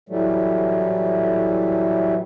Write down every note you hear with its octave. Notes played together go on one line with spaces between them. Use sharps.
A2 E3 F#3 G3 A3